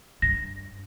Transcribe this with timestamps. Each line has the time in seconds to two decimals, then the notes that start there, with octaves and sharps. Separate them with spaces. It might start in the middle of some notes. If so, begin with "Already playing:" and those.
0.22 G2 A#6